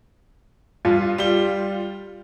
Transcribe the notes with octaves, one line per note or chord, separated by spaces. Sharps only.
G2 F4
G3 G7